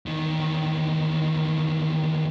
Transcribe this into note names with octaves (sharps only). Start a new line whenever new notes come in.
E2 D#3